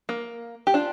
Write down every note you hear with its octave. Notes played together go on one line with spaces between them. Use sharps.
A#3
G4
D4 F4